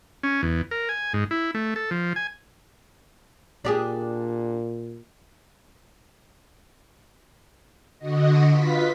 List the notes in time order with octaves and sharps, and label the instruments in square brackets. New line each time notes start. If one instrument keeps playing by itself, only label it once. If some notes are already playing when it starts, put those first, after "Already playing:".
[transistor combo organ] C#4
E2
A#4
G#5
G#2
E4
A3
A4
F3
G#5
[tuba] A#2 [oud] D4 G4 G#4
[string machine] D3 F#4 D#5
F4 B4 B6